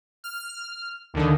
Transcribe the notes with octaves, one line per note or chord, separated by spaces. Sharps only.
F6
D#2 D3 D#3